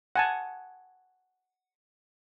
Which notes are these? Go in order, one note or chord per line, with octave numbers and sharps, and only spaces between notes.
F#5 G#5 A5